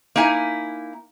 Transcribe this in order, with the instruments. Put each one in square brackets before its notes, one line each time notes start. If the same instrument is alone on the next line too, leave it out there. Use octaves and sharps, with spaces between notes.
[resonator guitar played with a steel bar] A#3 D#4 E4 G#5